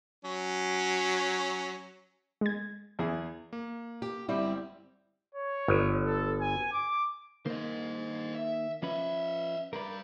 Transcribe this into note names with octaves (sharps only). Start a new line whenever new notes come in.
F#3 C#4
G#3 G#6
E2 E4 G#4
A#3
G4
G1 G3 C4 E4 D6
C#5
G1
A4
G#5
D6
D#3 A#3 C5 D#5
E5
F3 C#4 B4 D#5 E5
G2 A#4 B4 D5